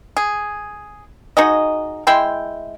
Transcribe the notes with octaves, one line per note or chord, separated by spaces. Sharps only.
G#4
D#4 F#4 G#4 D#5
G#3 E4 G5 C6